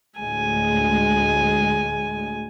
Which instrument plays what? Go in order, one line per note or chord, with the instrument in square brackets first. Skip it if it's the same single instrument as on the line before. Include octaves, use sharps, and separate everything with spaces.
[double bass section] D2 A2 G#3 [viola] G#5